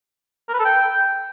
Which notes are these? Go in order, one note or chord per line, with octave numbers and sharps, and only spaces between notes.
A#4
B4
A4
G5